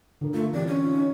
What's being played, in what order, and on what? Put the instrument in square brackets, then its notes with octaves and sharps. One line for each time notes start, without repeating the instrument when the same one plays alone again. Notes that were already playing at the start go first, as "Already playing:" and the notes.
[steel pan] D3 A#4
[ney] A3 [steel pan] F4
[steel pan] E3 C4 G4 [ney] D5
[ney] C#4
[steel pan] D#4 F4